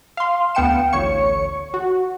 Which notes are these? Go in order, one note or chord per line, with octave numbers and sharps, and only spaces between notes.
F5 C6
D2 B3 F5 G5 C#7 E7
A1 D2 C#5 C#6 C#7
F#4